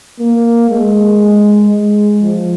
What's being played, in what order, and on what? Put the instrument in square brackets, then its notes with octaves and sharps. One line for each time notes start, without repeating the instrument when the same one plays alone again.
[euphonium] A#3
G#3
G#3
F3